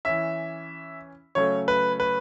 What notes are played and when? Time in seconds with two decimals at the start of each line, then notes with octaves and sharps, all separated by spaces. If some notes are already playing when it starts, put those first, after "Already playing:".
0.05 E3 C#4 E5
1.35 C#3 F#3 A3 C#4 C#5
1.68 B4
2.00 B4